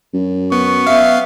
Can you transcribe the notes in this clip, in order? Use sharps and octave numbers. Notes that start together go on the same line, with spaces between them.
F#2
B3 C#6
B3 E5 F5